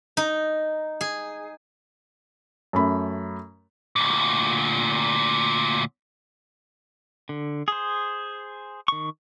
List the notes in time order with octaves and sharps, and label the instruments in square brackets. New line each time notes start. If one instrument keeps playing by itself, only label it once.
[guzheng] D#4
G#4
[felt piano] F#2 A3 B5
[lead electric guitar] D2 A#2
[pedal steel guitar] D3
G#4 C5
D#3 C#6